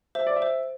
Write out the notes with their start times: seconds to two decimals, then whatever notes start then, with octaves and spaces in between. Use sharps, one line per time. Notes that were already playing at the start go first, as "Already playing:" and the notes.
0.15 C5 E5
0.27 D5
0.36 E5
0.42 C5